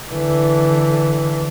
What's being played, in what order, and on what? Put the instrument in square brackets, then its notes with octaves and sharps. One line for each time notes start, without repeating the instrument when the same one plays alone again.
[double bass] D3 E3